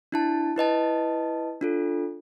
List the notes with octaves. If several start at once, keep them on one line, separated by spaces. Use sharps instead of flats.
D4 E4 A5
E4 B4 D#5 A5
D4 F4 A4